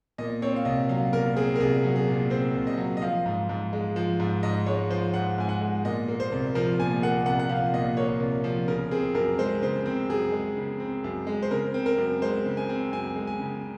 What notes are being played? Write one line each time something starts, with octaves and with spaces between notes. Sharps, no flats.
A#2 D#5
C4 C#5
F5
C2 D#5
F#3 F5
A#2 A#4
C4 G#4
A#4
C2 G#4
F#3
G#4
A#2
C4 C5
C2
D#5
F#3
D#5
F3 F5
G#2
G#2
G#3
F3
G#2
G#2 D#5
G#3 C#5
F3 C5
G#2 F#5
G#2 G#5
F#5
G#3
A#2 D#5
A#3
C5
C2
F3 A#4
A#2 G#5
A#3 F#5
C2 F#5
F#5
F3 F5
A#2 D#5
A#3 C#5
C2
F3
C#3 A#4
C4 G#4
F#2 A#4
G#3 C5
C#3 C5
C4
F#2 G#4
G#3
C#3
C4
F#2
G#3
C5
C#3 A#4
C4
A#4
F#2
G#3 C5
C#3
G#5
C4
F#2 G#5
G#3
G#5
C#3